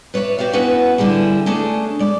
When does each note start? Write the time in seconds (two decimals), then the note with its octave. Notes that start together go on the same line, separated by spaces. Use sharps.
0.14 B4 C#5 D5 E5
0.38 F#4 G4 D5 F5
0.53 B3 C#4 E4 F#4 B4 F#5
0.98 D3 G3 E4 G#4
1.46 A3 C#4 D4 G#4 A4
1.99 G#3 D5